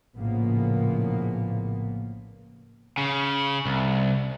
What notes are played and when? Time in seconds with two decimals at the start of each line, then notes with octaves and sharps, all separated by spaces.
0.18 A#1 A2 C#3 F3 A#3 B3
2.98 C#3
3.65 C2